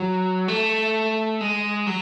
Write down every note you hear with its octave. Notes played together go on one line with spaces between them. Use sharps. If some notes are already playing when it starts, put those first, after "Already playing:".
Already playing: F#3
A3
G#3
F#3